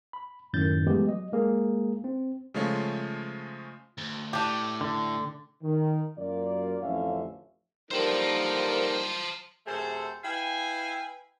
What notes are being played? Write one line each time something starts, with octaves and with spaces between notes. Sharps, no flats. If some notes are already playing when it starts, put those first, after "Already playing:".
B5
F#2 A2 D#3 G6 A6
E3 F#3 G#3 A3 B3 G4
F#3 D#5
G#3 A#3 G#4
C4
C#3 F3 G#3 A3 F4 C#5
D2
A2 D4 G4
D3
D#3
F#2 F#3 A#3 F4 D5
A1 F2 D3 C#4 E5 F5
D3 F3 G3 A#3 D#4 A#4 C5 A5
F#2 C3 A3 G#4 A4 C5
E4 B4 F5 G5 G#5